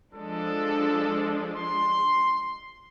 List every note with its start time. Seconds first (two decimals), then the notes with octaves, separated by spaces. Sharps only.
0.15 F3 G#3 D4 A4
1.56 C6